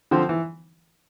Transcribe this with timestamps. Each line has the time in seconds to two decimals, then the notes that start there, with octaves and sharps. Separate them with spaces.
0.11 D3 F3 C4
0.29 E3